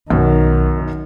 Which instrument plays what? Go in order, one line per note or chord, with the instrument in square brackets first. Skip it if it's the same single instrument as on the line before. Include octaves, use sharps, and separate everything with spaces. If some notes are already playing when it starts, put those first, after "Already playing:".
[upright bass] B1 [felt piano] F#2 B2 [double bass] D#3